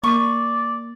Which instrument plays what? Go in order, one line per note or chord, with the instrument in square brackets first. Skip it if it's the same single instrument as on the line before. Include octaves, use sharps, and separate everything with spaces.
[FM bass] A#3 [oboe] D5 [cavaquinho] C#6